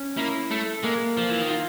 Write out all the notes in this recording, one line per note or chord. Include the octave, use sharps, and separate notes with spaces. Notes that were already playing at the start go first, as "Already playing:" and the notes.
Already playing: C#4
A#3 E4
A3 A4
G#3 A#3
F3 F4
E3
D#3
F4